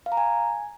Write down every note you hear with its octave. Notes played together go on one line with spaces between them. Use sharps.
F5
A#5
G#5